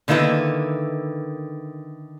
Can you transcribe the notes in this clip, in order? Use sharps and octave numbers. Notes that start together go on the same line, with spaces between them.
D3 D#3 A#3 E4 B4